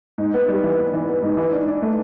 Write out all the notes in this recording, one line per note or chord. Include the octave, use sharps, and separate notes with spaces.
G#2
B3
G3
E3
B3
E3
B3
G#2
E3
D4
D4
A3